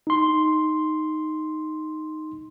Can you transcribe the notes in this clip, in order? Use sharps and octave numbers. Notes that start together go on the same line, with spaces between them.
D#4 C6